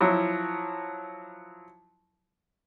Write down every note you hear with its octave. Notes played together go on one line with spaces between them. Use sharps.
F3 F#3 E4